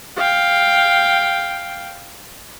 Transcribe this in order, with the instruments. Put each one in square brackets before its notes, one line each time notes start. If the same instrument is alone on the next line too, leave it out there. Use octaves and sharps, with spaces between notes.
[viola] F5 G5